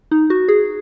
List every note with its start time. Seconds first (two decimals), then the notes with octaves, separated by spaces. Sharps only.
0.11 D#4
0.30 F#4
0.48 G#4